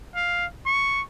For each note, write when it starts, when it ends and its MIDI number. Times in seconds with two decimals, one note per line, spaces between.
0.15 0.46 77
0.65 1.02 85